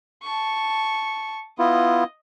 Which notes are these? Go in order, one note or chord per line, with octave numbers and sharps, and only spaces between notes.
A5 C#6
B3 E4 F4 D#5